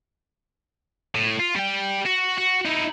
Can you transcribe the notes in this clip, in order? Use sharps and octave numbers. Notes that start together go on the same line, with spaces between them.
A2
F4
G3 G5
F#4
F#4
D#4 E4